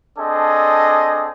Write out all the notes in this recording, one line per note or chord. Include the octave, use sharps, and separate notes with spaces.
C4 D4 G#4 A4 D#5